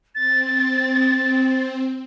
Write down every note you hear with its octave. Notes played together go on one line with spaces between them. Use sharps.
C4 A6